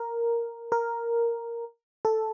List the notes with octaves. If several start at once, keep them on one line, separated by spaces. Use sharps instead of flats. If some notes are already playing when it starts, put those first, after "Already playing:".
Already playing: A#4
A#4
A4